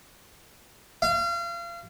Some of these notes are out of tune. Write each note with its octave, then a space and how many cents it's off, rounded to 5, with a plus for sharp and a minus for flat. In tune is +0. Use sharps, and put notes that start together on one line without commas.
F5 -35